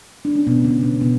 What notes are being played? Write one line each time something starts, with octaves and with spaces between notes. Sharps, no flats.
D4
C#4
B2 B3
C#3 C#4
C#3 C#4
B2 B3